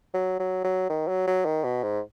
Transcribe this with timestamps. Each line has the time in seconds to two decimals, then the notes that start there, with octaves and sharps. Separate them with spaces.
0.14 F#3
0.39 F#3
0.64 F#3
0.90 D#3
1.08 F#3
1.27 F#3
1.46 D#3
1.64 B2
1.83 G#2